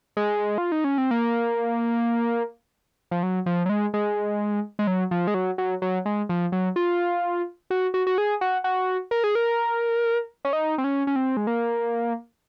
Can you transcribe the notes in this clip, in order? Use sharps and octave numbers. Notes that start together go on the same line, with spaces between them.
G#3
F4
D#4
C#4
C4
A#3
F3
F#3
F3
F#3
G#3
G#3
G#3
F#3
F3
G#3
F#3
F#3
F#3
G#3
F3
F#3
F4
F#4
F#4
F#4
G#4
F#4
F#4
A#4
G#4
A#4
C#4
D#4
C4
C#4
C#4
C4
G#3
A#3